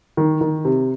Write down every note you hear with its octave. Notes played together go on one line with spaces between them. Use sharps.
D#3
D#3
C3